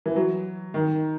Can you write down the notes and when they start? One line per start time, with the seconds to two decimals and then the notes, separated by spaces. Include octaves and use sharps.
0.06 E3
0.16 F#3
0.74 D#3